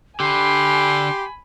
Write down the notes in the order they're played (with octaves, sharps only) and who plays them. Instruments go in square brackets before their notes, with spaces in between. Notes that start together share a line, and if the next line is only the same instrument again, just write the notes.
[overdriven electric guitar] D3 [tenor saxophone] G4 [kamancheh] G#5 B5 [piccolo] C6